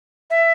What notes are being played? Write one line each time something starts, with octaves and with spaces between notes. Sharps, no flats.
E5